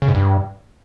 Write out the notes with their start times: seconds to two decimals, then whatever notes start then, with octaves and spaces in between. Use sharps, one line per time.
0.02 C#3
0.08 G#2
0.15 G2